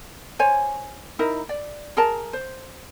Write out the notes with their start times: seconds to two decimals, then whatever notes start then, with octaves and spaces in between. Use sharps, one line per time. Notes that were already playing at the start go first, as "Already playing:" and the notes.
0.39 C5 C#5 G#5
1.19 D#4 E4 A#4
1.49 D5
1.97 G#4 A#4 A5
2.33 C5